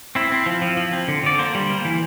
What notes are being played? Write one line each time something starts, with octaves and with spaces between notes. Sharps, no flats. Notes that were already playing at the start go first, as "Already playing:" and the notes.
C4 E4
C4
F3
F3
F3
C4
D3
D3 D5
A#3 C5
G3
A#3
E3